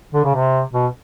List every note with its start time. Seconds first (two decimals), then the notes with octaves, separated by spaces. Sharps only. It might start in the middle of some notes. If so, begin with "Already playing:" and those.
0.14 D3
0.24 C#3
0.35 C3
0.73 B2